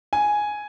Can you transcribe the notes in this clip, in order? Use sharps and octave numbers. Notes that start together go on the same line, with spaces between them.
G#5